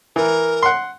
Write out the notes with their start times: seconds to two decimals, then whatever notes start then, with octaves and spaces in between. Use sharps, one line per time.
0.16 E3 A#4
0.63 F#5 C6